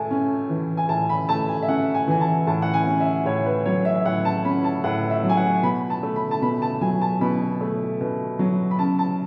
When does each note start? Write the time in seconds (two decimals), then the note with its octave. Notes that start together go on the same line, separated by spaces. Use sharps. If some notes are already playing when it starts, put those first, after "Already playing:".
Already playing: A2 A3 G#5 A5
0.11 C#4
0.49 E3
0.77 G#5
0.89 A2 A5
1.09 B5
1.29 A3 A5
1.48 G#5
1.63 E5
1.69 C#4 F#5
1.94 G#5
2.08 E3 G#5
2.21 A5
2.47 A2 A5
2.62 F#5
2.74 G#5
2.86 C#4
3.00 E5
3.26 A2 C#5
3.46 B4
3.66 F#3 C#5
3.85 E5
3.95 E5
4.05 A2 F#5
4.25 A5
4.44 C#4 B5
4.64 A5
4.84 A2 F#5
5.10 E5
5.23 F#3
5.29 G#5
5.37 F#5
5.63 B2 B5
5.90 A5
6.03 A3
6.16 B5
6.31 A5
6.42 B2 B5
6.62 A5
6.81 F#3 G#5
7.01 A5
7.21 B2 B5
7.61 A3
8.01 B2
8.39 F#3
8.71 B5
8.79 C#3 A5
8.99 A5